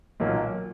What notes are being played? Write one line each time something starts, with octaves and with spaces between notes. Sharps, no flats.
B1 A#2 F#3 A#3